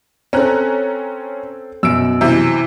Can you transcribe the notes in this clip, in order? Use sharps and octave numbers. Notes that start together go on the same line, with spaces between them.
C4 C#4 A4 A#5 F#6
F#2 B2 E6 D7
C3 E3 E4